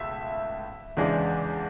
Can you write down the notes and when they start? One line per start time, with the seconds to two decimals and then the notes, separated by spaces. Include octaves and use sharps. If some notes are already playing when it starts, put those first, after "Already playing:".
Already playing: C#2 B2 A3 E5
0.97 E2 C#3 E3 G#3 D4